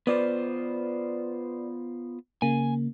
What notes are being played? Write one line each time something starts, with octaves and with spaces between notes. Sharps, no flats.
B3 F4 B4 C5 D5
C#3 A#3 G#5